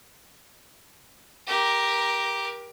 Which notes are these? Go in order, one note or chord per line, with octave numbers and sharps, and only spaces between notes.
G4 A#4